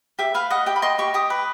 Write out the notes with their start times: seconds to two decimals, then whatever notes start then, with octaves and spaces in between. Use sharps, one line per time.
0.19 G4 E5
0.34 B4 F5
0.50 D#5 F#5
0.66 G4 G5
0.76 B5
0.82 D#5 C6
0.98 G4 C#6
1.14 G4 D#6
1.30 B4